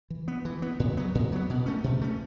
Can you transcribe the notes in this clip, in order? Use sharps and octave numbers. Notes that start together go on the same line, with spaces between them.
E3
B3
E3
B3
A2
F#3 B3
A2
F#3 B3
B2
A3 C#4
B2
A3 C#4